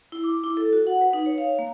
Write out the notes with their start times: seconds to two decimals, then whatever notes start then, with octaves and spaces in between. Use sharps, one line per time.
0.12 E4
0.24 D6
0.44 E4
0.57 A4
0.73 F#4
0.87 F#5
1.01 B4
1.13 D#4
1.26 C#5
1.38 F5
1.59 A#3